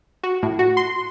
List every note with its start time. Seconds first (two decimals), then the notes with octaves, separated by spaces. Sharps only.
0.23 F#4
0.43 A2
0.59 F#4
0.77 C6